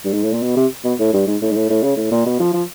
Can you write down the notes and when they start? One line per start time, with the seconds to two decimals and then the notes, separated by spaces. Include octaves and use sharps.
0.04 G2
0.14 G#2
0.23 A2
0.33 A#2
0.43 B2
0.57 C3
0.84 B2
1.00 A2
1.13 G2
1.27 G#2
1.42 A2
1.51 G#2
1.56 A2
1.70 A2
1.83 C#3
1.97 A2
2.11 A#2
2.26 B2
2.40 F3
2.54 F3